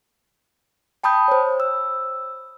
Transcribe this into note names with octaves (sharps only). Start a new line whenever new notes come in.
G5 A5 B5 D#6 G6
C5 C#5
E6